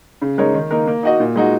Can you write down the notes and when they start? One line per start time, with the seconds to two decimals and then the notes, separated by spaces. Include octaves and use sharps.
0.22 C#3
0.38 G#3 D#4 A#4 C#5
0.54 D#3
0.71 A#3 D#4 A#4
0.87 A#3
1.03 D#4 F#4 D#5
1.20 A#2
1.36 G#3 D#4 F#4